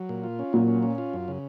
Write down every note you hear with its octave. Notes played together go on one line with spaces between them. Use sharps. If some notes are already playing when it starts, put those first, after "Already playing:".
Already playing: F#3
A#2
F4
C#4
A#2 F#3
C#4
C#4
F4
F#2
C#3